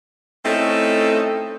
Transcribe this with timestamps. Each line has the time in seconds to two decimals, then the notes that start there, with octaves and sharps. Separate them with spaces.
0.45 A3 C4 C#4 D#4 E4 A4